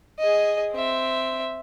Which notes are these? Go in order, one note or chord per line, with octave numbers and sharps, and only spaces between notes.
G#4 D#5
C4 E5